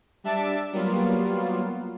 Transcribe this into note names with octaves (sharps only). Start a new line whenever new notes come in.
G3 D4 E5 A5 D6
F#3 G3 A#3 B3 F4